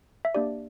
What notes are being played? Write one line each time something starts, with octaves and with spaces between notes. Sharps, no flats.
E5
A#3 D4 G4 D5